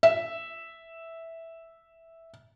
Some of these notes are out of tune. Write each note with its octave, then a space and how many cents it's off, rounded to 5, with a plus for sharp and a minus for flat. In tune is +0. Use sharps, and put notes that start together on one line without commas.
E5 -5